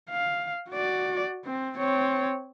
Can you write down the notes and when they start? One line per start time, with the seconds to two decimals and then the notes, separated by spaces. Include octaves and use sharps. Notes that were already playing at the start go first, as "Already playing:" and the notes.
0.10 F5
0.70 F#4 D5
1.45 C4
1.78 C4 C#5